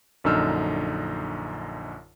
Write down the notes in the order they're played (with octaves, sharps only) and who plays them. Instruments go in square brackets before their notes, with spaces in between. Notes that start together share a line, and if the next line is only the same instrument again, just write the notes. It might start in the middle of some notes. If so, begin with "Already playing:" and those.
[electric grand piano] A#1 F#2 D3 D#4 E6 F6